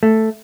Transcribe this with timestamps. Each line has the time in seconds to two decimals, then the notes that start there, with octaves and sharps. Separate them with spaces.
0.03 A3